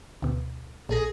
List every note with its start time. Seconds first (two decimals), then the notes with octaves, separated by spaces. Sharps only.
0.22 D2 B2
0.89 A#1 G#4 A4 A#6